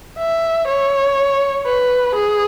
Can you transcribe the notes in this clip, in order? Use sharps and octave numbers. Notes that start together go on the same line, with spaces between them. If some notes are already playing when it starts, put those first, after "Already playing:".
E5
C#5
B4
G#4